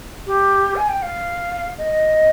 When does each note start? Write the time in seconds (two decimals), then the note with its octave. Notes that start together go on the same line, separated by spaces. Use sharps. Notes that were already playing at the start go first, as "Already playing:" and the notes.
0.27 G4
0.76 G#5
0.89 G5
1.02 F5
1.78 D#5